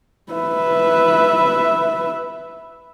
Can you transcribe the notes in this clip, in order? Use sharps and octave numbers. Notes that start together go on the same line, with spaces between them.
B4 E5